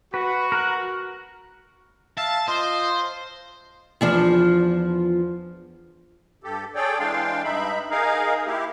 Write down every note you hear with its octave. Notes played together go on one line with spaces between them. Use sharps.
F#4 B4
A#4 F#5
E5 F5 A5
F4 C5 D#5
E2 F3 D4
G2 G4 A4
G#4 A4 C#5 D5 G5
E3 G#3 D4 F5 G5 C6
G2 D#4 E5 B5
D#4 G#4 A#4 F5
A#3 E4 G4